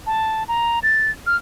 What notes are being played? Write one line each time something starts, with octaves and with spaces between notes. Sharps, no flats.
A5
A#5
A6
F6